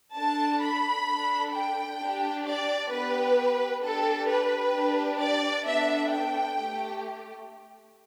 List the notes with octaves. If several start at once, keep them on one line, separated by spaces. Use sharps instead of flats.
D4 A4 A5
B5
D4 A4
G5
D4 G4
D5
B3 G4 B4
D4 G4 A4
B4
D4 G4
D5
B3 D4 A4 E5
G5
A3 G4